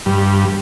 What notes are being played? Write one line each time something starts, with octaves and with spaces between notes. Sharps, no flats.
G2